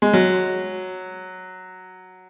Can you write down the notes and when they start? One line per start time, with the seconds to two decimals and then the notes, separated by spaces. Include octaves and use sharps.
0.02 G#3
0.13 F#3